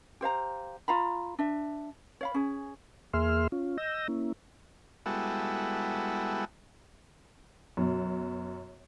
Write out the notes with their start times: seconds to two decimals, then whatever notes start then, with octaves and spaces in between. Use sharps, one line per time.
0.21 G4 C5 F5 A#5
0.88 F4 F5 A#5 B5
1.39 D4 E5
2.21 C#5 F5 B5
2.34 C#4 G#4
3.13 E2 A#3 G#4 E5 C6 F6
3.52 C#4 F4
3.78 D#5 E6 G6 A#6
4.08 A#3 C#4 E4
5.06 G3 G#3 B3 E4 F#4 A4
7.77 F#2 B2